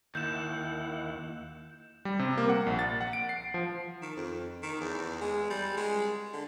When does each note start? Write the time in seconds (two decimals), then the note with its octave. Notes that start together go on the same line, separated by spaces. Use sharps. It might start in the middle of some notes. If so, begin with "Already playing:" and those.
0.15 D#2 D#3 E4 F#5 G6 E7
2.05 G3
2.19 C3
2.37 A#3
2.49 F#5
2.66 A#1
2.79 A6
3.01 F#5
3.13 D7
3.29 C7
3.54 F3
4.02 D#3
4.16 F2
4.63 D#3
4.80 E2
5.21 G#3
5.50 G3
5.77 G#3
6.33 D3